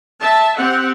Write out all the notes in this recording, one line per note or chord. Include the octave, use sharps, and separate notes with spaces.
E5 A5
C4 G4 F#5